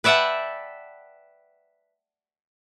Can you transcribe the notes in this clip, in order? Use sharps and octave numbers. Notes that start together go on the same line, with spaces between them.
B4 D5 E5 F#5 G5 A5